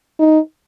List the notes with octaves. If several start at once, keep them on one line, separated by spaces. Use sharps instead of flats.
D#4